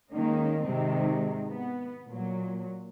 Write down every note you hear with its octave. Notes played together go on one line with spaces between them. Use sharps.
D#3 G#3 A#3 C#4 D#4
G#2 C3 D#3 G#3 C4 D#4
B3
A#2 F#3